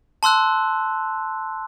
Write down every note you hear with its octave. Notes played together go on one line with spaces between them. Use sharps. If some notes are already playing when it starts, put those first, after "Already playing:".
A5 C6 E6 F#6